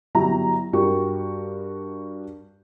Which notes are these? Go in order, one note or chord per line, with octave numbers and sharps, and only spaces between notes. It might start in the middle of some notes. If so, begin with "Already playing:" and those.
G1 F#3 E4 G4 A#5
G2 F#4 G4 A#4 C#6